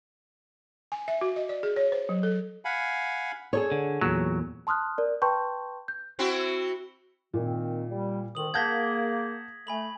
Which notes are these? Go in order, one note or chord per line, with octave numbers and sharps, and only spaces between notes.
G#5
E5
F#4
D#5
D5
G#4
C#5
C5
F#3
A4
F5 F#5 G#5 B5
G#4 A4 C#5
D3
E2 A#2 F#3
A5 C6 D#6 F6 F#6
A#4 D5
B4 G5 A5 C6 C#6 G6
G6
C4 E4 F#4
A#2 D#3 C4
G3
D2 D3 D#3 D#6 F#7
A#3 G#4 F#5 A5 G6 G#6 A#6 B6
A3 G#5 B5 F#7